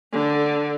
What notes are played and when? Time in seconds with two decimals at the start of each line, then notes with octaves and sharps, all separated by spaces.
0.12 D3